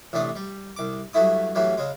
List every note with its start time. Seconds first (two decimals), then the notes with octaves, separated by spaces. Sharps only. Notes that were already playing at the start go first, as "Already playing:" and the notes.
0.13 A1 C3 A3 D4 D#6
0.35 G3
0.76 C2 D6
1.13 G2 F#3 A3 E4 D#6
1.55 A2 E3 F#3 G3
1.77 C#3 G#3